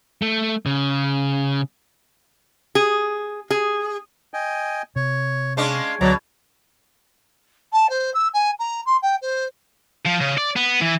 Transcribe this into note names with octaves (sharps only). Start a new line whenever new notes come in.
A3
C#3
G#4
G#4
D#5 G5 G#5
C3 C#5
G#3 C#4 D4 F5 C6
D2 B2 F#3 D5 A#5
A5
C5
E6
G#5
A#5
C6
G5
C5
F3
C#3
D5
B3
E3